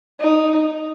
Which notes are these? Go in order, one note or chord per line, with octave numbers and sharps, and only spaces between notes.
D#4